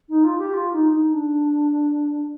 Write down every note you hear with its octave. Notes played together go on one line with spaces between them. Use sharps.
D#4
F4
G4
F4
D#4
D#4
D4